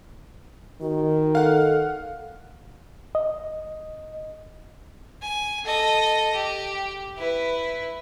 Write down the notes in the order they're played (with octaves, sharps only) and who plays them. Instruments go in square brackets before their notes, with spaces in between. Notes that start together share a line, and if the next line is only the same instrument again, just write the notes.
[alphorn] D#3 [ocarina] F#4
[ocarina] A4 [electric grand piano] F5 F#5
[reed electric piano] D#5
[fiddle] G#5
A4 D#5
G4
E4 B4